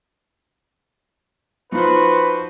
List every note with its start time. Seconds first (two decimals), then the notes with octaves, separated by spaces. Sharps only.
1.72 F3 D#4 F4 F#4 B4 C5